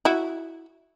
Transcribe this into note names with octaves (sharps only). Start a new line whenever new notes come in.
E4 F#4